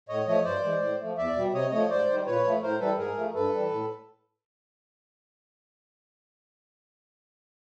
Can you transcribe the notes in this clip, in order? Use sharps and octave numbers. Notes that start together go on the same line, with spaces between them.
A2 C#5 D#5
F3 A3 C#5 D#5
G2 C5 D5
E3 G#3
A2
F3 A3
E2 D5 E5
B2 G3
C3 C#5 D#5
F3 A3 C#5 D#5
G#2 C5 D5
D#3 G3
A#2 B4 C#5
F3 A3
A2 A#4 C5
E3 G3 A4 B4
G#2 G#4 A#4
F3 A3
G2 A4 B4
E3 G3
A2